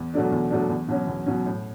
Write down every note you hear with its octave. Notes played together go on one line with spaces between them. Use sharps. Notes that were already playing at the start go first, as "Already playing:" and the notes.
Already playing: E2
B2 F#3 A3 D4
E2
B2 F#3 A3 D4
E2
B2 F#3 C#4
E2
B2 F#3 C#4
A2